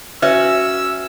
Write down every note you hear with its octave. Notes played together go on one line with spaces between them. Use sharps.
C#4 F#4 B4 E5 E6